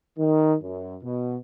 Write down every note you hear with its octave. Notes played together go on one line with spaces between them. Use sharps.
D#3
F#2
B2